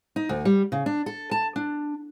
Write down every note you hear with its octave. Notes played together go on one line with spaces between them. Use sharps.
D#4
D2
G3
C#3
D4
A4
A5
D4